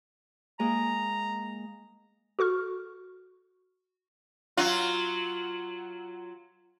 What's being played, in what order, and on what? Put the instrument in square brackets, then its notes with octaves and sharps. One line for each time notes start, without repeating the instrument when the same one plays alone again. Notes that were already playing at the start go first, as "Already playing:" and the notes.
[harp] G#3 A#3 G#4 [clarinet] A#5
[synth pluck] F#4 A4 C#6 F6
[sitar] F#3 F4